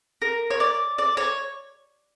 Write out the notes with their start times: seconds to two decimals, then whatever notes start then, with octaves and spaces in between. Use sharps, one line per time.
0.22 A#4
0.50 C#5
0.60 D5
0.98 D5
1.17 C#5